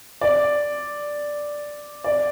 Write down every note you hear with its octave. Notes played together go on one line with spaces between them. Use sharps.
D5
D5